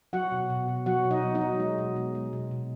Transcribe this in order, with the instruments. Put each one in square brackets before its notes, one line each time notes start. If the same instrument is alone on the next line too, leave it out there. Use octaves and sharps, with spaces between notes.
[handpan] F#3 F#4 F#5
B2
B2
B2
F#3 F#4 F#5
B2
D#4 D#5
F#3
D#4 D#5
F#3
G#3
B2
G#3
G#3
B2
B2